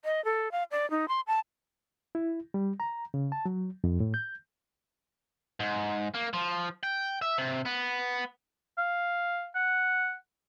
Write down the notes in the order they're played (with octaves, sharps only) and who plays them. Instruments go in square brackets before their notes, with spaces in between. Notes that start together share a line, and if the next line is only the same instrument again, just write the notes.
[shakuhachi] D#5
A4
F5
D5
D#4
C6
A5
[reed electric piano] E4
G3
A#5
C#3
A5
F#3
F2
A2
G6
[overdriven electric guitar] G#2
A#3
F3
G5
E5
C3
B3
[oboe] F5
F#5